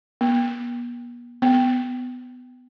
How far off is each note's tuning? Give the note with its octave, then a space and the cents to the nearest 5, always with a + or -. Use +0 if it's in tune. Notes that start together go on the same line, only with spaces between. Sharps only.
B3 -40
B3 +15